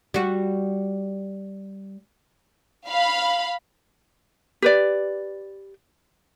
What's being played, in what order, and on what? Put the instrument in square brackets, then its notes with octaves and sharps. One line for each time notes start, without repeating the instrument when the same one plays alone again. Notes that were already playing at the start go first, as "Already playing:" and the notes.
[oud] G3 F#4
[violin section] F5 B5
[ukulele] G4 B4 D5